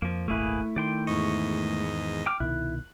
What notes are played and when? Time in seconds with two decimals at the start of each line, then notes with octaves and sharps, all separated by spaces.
0.02 F2 F3 A#3
0.28 D#1 G#1 A3 A#3 E4 G#4 B4
0.76 D#3 D5 G5 C6
1.07 E2 G#2 D#5 C#6
2.26 G5 D6 F6
2.40 C2 B2 D#3 E4 F#6